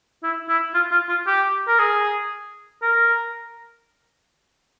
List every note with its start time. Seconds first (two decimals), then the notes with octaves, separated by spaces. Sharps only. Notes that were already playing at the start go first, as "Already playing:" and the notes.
0.23 E4
0.49 E4
0.74 F4
0.92 F4
1.09 F4
1.27 G4
1.68 A#4
1.79 G#4
2.82 A#4